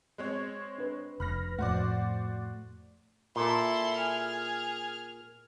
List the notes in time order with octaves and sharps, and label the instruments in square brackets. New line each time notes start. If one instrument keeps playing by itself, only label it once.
[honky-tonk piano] G#3 C4 C#5
[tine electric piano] D4 B4
[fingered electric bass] F1 [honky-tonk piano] B5 F6 A#6
[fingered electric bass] F2 A2 [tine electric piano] A3 [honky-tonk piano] F#4 C5 D5
[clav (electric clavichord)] A#2 [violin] E4 C6 [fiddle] A4
[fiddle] G#4 [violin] F6